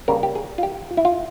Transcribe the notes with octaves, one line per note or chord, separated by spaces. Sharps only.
C#3 G3 A#3 A#4
G4
G#4
F4
G4
F4
E4
F4